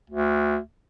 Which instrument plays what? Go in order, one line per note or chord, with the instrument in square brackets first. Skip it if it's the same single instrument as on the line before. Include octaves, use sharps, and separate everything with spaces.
[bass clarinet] D2